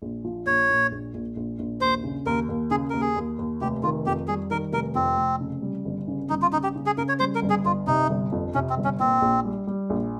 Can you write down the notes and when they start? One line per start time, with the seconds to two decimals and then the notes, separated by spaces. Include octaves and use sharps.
0.02 A#1
0.25 F3
0.46 A#1 C#5
0.69 A#2
0.91 A#1
1.14 A#1
1.36 A#1
1.59 A#1
1.81 D#2 C5
2.04 C#3
2.26 D#2 A#4
2.49 D#2
2.71 C#3 G#4
2.90 D#2 A#4
3.01 G#4
3.16 D#2
3.39 D#2
3.61 F1 G4
3.83 D#3 F4
4.06 F2 G4
4.28 G3 G#4
4.51 D#3 A#4
4.72 F1 A#4
4.95 F2 C4
5.18 F1
5.41 C#3
5.62 G3
5.85 G1
6.08 C#3
6.30 G1 D#4
6.42 F4
6.53 C#3 D#4
6.63 G4
6.76 C#3
6.86 G#4
6.97 C#3 A#4
7.08 C#5
7.20 G3 C5
7.35 A#4
7.42 G1
7.50 G#4
7.65 G1 F4
7.87 C3 D#4
8.10 G1
8.32 F2
8.54 C3 C#4
8.70 C4
8.77 G1
8.84 C#4
9.00 A#2 C4
9.22 A#1
9.45 G3
9.67 G3
9.90 A#1